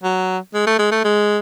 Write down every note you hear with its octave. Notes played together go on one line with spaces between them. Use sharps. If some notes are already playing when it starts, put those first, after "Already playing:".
F#3
G#3
A3
G#3
A3
G#3